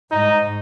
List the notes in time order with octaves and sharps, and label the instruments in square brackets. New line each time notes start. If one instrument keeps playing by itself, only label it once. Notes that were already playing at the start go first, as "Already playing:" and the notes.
[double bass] G#2 [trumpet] D#4